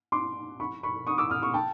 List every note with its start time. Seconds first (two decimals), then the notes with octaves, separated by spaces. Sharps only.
0.12 C6 D6
0.60 B5 C#6
0.83 B5 C#6
1.07 C#6 D#6
1.18 D6 E6
1.30 D#6 F6
1.42 C#6 D#6
1.54 G5 A5